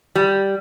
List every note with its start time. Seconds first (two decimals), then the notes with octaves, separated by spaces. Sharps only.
0.15 G3